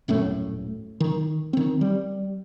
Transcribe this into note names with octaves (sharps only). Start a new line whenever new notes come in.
D#1 F#2 A2 A3
D#3
D#3 C4
G3